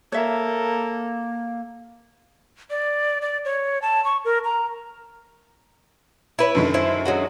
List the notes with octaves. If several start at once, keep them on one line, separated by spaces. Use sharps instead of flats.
A#3 A4 A#4 C#5 E5
D5
D5
C#5
A5
C#6
A#4
A#5
E4 B4 C#5
F#2 D3 D#3
E4 C5
F#3 G#3 F#4